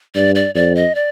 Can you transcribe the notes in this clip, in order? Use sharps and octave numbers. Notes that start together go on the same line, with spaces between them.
G2 D5
D5
F2 D5
D#5
D5